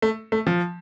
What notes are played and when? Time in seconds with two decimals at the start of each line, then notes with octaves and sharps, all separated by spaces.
0.02 A3
0.32 A3
0.47 F3